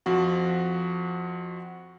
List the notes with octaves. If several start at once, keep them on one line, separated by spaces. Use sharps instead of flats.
F2 F3 F#4 F#5